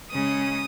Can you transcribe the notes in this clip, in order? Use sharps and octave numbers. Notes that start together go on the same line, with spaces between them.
C#3 G#3 C#4 D#6